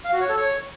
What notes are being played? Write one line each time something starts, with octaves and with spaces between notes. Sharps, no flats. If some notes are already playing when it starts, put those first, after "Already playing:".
F5
F#4
C#5
A4
C#5